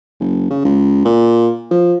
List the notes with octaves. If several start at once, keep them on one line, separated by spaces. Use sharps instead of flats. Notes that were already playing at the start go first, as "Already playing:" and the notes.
F#1
C#3
C#2
A#2
F3